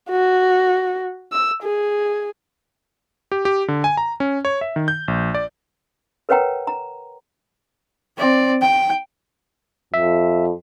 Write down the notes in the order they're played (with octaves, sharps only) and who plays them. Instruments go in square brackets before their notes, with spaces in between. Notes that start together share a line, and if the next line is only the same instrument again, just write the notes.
[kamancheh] F#4
E6
G#4
[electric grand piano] G4
G4
D3
G#5
A#5
C#4
C#5
E5
D#3
G6
A#1
D5
[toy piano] A#4 B4 C#5 F#5 G5 A#5
A#5
[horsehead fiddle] C4 D5
G5
[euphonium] F2 [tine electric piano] E5